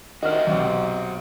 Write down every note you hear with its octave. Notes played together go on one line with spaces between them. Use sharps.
D#3 F#4 C5 D#5 E5 F6
B1 C3 C4